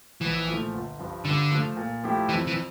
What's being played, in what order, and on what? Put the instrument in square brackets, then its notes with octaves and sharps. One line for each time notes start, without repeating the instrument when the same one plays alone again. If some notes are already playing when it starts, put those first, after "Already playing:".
[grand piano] A#1 [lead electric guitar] E3
[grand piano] A#2 F3 A3
G1
G2 F3
[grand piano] G2 [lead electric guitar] D3
[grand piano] F3 A3
A#2
F3 A3 E4 G4
[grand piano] F2 [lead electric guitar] E3
[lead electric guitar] E3